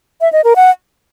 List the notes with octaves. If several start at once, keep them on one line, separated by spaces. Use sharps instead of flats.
E5
D#5
A#4
F#5